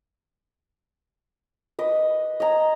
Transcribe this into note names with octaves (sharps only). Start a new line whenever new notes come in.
B4 D#5
D#5 G#5 A#5